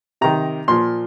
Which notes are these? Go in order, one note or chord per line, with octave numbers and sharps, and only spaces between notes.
C3 D#3 A#5
A#2 F3 C6